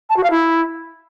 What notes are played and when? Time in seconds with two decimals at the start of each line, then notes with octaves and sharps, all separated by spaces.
0.10 A5
0.17 F#4
0.24 F5
0.31 E4